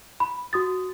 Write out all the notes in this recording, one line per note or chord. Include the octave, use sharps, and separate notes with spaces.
B5
F#4 D#6 A6